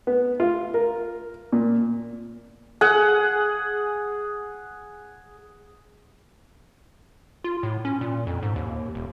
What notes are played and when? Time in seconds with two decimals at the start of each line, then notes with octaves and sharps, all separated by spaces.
0.07 B3
0.40 F4
0.74 A#4
1.53 A#2
2.81 G#4 F#5
7.44 F4
7.63 A2
7.85 C#4
8.01 A#2
8.27 F2
8.43 G#2
8.56 D#2
8.95 D#1